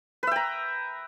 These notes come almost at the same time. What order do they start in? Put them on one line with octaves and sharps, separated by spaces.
B4 E5 G5 A#5